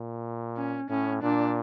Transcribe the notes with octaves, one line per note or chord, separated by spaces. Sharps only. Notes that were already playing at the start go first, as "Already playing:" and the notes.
Already playing: A#2
C#4
A2 C#4
A#2 D4